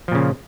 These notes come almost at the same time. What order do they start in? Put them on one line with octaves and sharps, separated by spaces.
F3 A#2 C#3